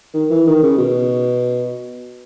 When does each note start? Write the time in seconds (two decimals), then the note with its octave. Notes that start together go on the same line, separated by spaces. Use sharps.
0.14 D#3
0.30 E3
0.47 D#3
0.63 C#3
0.78 B2